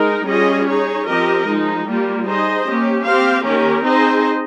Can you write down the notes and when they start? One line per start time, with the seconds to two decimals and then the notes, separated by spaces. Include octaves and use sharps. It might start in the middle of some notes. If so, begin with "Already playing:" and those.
Already playing: G#3 D#4 A#4
0.27 G3 C#4 F4 G#4 D#5
0.67 D#4 G#4 C#5
1.06 F3 C4 G4 A#4 D#5
1.46 F3 G#3 D#4
1.86 G3 A#3 F4
2.26 D#4 G#4 C5 D#5
2.66 A#3 C#4 G4
3.05 C4 G4 C5 F5
3.45 D#3 A#3 C#4 G4 A#4
3.84 C4 D#4 G#4 C5 D#5